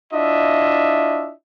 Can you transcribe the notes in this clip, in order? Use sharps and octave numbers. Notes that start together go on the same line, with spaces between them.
D4 E4 F4 D#5 E5